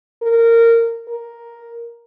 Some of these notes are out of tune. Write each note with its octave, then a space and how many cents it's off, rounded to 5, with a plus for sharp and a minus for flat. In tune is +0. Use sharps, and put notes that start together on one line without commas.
A#4 -15
A#4 +5